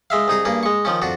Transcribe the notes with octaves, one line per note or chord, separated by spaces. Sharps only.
G#3 E5 F5
C2 D#4 G#4 A#5
G2 A#3 G#4
G#3 C#6
D#3 F3 C#4
F2 D4 F#4